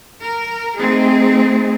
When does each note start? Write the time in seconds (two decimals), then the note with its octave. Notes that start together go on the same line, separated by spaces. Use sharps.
0.21 A#4
0.77 A3 C4 D#4 G#4